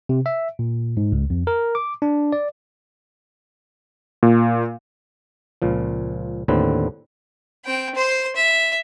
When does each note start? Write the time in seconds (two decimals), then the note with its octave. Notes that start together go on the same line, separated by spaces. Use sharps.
0.09 C3
0.26 E5
0.59 A#2
0.97 G#2
1.12 C#2
1.30 F2
1.47 A#4
1.75 D6
2.02 D4
2.32 D5
4.23 A#2
5.62 C#2 A#2 F3
6.48 D#2 A2 D3 C4 B4
7.65 C4 G5
7.95 C5 C6
8.36 E5